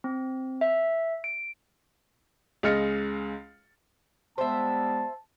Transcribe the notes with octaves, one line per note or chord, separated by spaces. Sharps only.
C4
E5
D7
C#2 G#3 D#5 F6 A6 C#7
G3 G#3 B3 C5 E5 A5